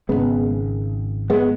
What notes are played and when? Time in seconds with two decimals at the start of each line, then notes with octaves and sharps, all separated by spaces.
0.09 G#1 F#2 C#3 G#3 B3
1.30 G#3 B3